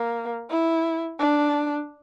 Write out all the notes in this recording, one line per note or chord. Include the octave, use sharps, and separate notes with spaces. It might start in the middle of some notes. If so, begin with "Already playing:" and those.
Already playing: A#3
E4
D4